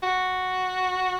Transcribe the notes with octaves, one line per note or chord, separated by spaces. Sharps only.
F#4